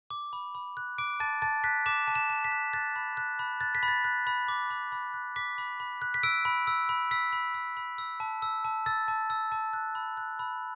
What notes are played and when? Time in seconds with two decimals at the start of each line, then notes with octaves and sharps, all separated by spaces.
0.10 D6
0.33 B5
0.55 B5
0.77 F#6
0.98 D6 D7
1.20 A5 A6
1.42 A5 A6
1.64 F#6 B6
1.86 D6 E7
2.07 A5
2.15 E7
2.30 A5
2.44 B6
2.52 F#6
2.73 F#6 A6
2.96 B5
3.17 F#6
3.39 B5
3.61 F#6 A6
3.75 B6
3.83 B5
3.88 A6
4.04 F#6
4.27 B5
4.48 D6
4.71 B5
4.92 B5
5.14 F#6
5.36 D6 B6
5.58 B5
5.80 B5
6.02 F#6
6.14 B6
6.23 E6 D7
6.45 B5
6.67 E6
6.89 B5
7.11 E6 B6
7.33 B5
7.54 E6
7.77 B5
7.98 E6
8.20 A5
8.42 E6
8.64 A5
8.86 E6 A6
9.08 A5
9.30 E6
9.52 A5
9.73 F#6
9.95 B5
10.17 F#6
10.39 B5